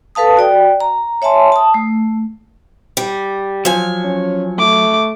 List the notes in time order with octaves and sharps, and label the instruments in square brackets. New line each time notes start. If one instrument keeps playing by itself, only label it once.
[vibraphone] A4 B4 F5 A5 D#6
F#4 D5 G5
A#5
C#5 E5 G#5 A5 C6
A5 D#6
A3
[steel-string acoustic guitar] G3
[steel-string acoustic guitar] F3 G#5 [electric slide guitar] F#3
[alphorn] C#4
[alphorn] A3 [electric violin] D6